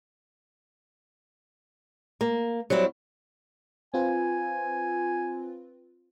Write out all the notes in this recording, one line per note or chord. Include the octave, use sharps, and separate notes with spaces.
A#3
F#3 G3 C4 E4
C4 F4 B4 G#5